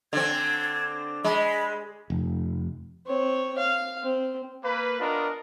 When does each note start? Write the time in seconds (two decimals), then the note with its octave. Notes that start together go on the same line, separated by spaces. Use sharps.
0.13 D3 C4 G#6
1.24 G#3 B5
2.10 F1
3.07 C4 C#5
3.58 F5
4.03 C4
4.64 A#3 B4
5.00 B3 D4 F4 A#4 D#5